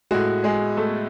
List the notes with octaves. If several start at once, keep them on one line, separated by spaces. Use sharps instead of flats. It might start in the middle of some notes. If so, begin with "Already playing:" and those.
A2 G#3 F#4
G#3 G#4
A3 A4